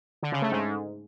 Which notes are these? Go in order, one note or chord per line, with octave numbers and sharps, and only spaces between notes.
D3
C#3
A3
G#2